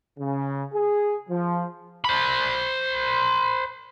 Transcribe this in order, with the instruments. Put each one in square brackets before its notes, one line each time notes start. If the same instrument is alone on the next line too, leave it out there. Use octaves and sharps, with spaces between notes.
[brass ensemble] C#3
G#4
F3
[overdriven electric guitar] C5 B5